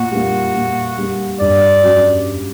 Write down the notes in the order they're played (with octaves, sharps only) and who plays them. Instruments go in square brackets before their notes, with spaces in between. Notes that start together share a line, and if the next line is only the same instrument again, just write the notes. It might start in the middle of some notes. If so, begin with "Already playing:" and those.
Already playing: [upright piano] A#2 [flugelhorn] F#4
[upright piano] G3 A#3
A#2
G3 A#3
[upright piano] G2 [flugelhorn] D5
[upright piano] F#3 C#4 F#4